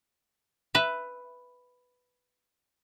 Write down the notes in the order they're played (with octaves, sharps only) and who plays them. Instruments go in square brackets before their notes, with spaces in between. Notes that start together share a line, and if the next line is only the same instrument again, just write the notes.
[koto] B4 E5